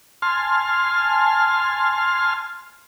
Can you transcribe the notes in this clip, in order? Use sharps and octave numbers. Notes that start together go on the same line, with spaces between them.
G#5 A5 C6 F6